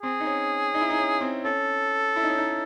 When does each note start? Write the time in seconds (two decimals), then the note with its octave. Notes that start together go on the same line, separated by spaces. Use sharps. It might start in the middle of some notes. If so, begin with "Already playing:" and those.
0.03 C4 G#4
0.20 D#4
0.26 C#4
0.74 D#4
0.81 E4
0.90 D#4
0.98 C#4
1.21 C4
1.45 C#4 A4
2.16 E4
2.23 D#4
2.30 C#4
2.38 D#4